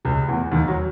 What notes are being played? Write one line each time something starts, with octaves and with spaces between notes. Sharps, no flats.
C#2 C#3
E2 E3
D#2 D#3
F#3